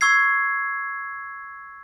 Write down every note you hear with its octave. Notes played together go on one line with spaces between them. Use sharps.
C#6 E6 G#6 C7